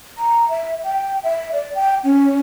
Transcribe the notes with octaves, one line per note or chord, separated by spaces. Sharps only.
A#5
E5
G5
E5
D5
G5
C#4